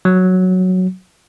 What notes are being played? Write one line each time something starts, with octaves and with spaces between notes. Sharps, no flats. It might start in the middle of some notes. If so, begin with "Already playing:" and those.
F#3